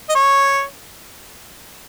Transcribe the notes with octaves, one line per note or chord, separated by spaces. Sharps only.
D#5
C#5